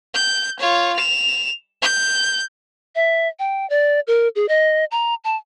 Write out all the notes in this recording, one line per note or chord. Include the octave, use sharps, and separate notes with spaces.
G6
F4 C#5
E7 F7
G6
E5
G5
D5
A#4
G#4
D#5
A#5
A5